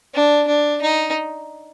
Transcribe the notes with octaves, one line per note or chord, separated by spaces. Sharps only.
D4
D4
D#4